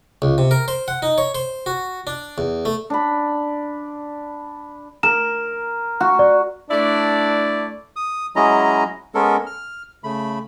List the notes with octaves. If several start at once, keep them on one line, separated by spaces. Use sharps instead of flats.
C#2
C3
A#4
C5
F#5
D#4
C#5
C5
F#4
D4
E2
A3
D4 B5
A#4 E7
F#4
D5
A3 D4 E4 D5
D#6
F#3 G#3 C#4 E4 D#5 A#5
G#3 B3 C#4 A4 A#4
F6
C#3 A3 B5